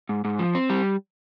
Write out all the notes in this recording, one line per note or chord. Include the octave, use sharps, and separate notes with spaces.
G#2
G#2
F3
C4
G3